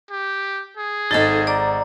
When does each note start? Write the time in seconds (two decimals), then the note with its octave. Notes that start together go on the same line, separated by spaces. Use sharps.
0.10 G4
0.77 G#4
1.11 G#1 D#4 A4 D#5 A6
1.47 D5 A#5 D6